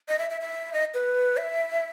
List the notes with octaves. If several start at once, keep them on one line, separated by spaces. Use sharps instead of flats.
D#5
E5
E5
E5
D#5
B4
E5